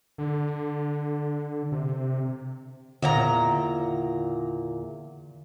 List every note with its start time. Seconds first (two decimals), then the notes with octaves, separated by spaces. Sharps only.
0.18 D3
1.72 C3
3.02 E2 A#2 D3 A#5